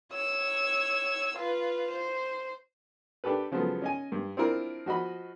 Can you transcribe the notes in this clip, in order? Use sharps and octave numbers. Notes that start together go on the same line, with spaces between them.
C#5 E6
F4 B4
C5
D4 G4 A4 B4
C#3 F3 F#3 G#3 B3 A4
C#4 D#5 G#5
G2
C4 D4 E4 F4 A#4
F3 F#4 D#5 B5